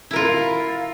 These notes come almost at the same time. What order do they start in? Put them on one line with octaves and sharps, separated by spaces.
E4 A#4 F4